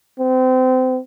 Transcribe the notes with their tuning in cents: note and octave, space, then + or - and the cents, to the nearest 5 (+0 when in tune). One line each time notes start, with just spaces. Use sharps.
C4 -30